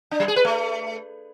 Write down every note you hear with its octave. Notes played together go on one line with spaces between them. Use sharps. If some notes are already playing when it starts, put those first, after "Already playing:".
D4
G3
G#4
B4
A3